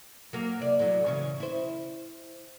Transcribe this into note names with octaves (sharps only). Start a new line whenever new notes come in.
F#3 A#3
C3 D5
A2 F#3
C#3 E3 C#4
E4 C5